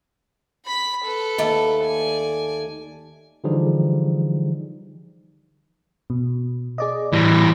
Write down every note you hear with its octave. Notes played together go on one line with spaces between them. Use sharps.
B5 B6
A4 B4
D#2 A3
D5 G#5
D3 E3 F3 G3 D#4 G#4
B2
G#4 D5 D#5
A2 E3 G3 A#6